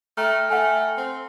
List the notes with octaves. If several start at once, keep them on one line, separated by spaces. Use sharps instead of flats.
A3 G5 A#5 F6
A3 F#5 G#5
C4